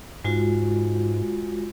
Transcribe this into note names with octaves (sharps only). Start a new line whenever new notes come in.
G#2 G#3 F4 F#4